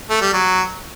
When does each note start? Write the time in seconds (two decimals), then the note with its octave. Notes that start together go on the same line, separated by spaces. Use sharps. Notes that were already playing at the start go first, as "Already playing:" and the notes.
0.10 A3
0.22 G3
0.33 F#3